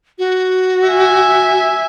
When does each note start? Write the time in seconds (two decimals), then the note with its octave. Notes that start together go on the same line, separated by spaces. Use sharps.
0.19 F#4
0.87 E5 G#5